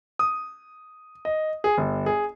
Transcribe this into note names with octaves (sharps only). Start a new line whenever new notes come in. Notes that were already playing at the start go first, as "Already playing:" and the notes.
D#6
D#5
G#4
G1
G#4